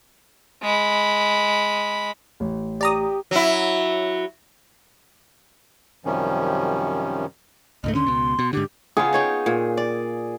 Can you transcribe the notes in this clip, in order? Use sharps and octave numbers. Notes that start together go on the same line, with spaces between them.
G#3 B5
A1
G4 D5 A#5 D#6
F#3 E4
F#2 C3 D#3 F3 G3 C#4
C#2 G#2 A3 D#5
D#2 D3 C#4 C6
C#2 B2
B2
G#2 D3 G4
C#3 B3 F4 G#4
D#4 C#5 G5
A#2
D5